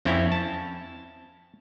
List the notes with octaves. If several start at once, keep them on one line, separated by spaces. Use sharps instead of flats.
F2 C4 C#4 E4 C#5
A5